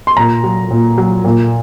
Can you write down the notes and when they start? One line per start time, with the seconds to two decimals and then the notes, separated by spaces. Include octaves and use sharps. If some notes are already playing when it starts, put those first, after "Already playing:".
0.07 C6
0.17 A#2 A#5
0.44 F#3
0.71 A#2
0.98 F#3
1.25 A#2